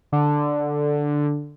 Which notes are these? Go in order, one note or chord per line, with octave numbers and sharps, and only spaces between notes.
D3